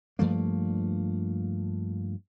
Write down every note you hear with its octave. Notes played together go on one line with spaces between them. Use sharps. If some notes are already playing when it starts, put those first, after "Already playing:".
G2 F3 A3 A#3